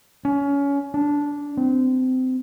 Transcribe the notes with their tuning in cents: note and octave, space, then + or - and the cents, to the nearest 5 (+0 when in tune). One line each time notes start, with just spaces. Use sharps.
C#4 +25
D4 -10
C4 -25